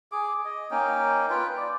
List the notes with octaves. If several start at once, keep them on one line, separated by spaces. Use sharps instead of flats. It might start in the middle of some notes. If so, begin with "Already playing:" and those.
G#4 D6
D#5
A#3 C#4 D#4 G5
F4 B4 G5
D5